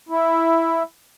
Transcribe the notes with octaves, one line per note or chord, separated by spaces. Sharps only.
E4